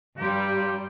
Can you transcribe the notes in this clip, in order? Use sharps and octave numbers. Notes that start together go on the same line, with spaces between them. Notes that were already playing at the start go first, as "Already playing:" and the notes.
G2 G3 G4 F5 A#5 C6